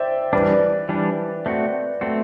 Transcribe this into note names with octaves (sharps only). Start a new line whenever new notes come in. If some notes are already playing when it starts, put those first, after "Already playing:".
Already playing: C5 D5 E5 G5
E3 G3 D4 B4 D5
E3 G3 D4
A3 C4 F#4
A3 C4 F#4